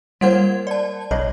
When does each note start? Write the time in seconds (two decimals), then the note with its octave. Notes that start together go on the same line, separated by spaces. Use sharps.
0.21 G3 G#3 A#3 C5 F#5 G#6
0.67 D5 A5
1.11 B1 F#3 C#5 D#5